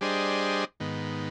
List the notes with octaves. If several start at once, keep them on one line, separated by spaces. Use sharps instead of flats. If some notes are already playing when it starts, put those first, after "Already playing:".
G3 D4 G#4 C5 D#5
G#2 D#3 B3